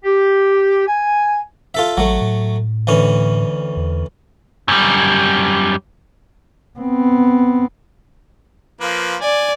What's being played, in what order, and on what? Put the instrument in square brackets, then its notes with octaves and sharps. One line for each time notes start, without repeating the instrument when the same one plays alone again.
[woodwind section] G4
G#5
[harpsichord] F4 A4 E5
[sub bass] A1 [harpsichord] F#3 A3
[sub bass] A2
[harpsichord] D2 E3 C#4
[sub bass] E2
[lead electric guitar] F#2 G3
[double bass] B3 C4
[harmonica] F3 A#3 B4
[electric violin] D5 [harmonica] G#5